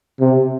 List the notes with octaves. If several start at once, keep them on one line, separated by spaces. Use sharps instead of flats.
C3